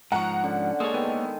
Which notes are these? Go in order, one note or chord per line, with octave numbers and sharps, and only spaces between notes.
G#2 F3 F#5 A#5 C#6
D3 C#4 D4
G#3 A#3 A4 C#5 D#6
D#3 B3 D#7